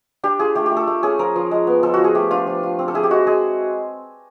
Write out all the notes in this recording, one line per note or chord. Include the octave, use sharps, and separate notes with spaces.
D4 G4
F4 G#4
A3 G4
G4
A3
A4
A3
C#4 G#4
F3 A#4
F3
G#3
B3
F3 A4
F3 F#4
G#4
A3 G4
D4 F4
F3
F4
C4
A4
E4 G#4
G4
G#3 F#4
G#3 G#4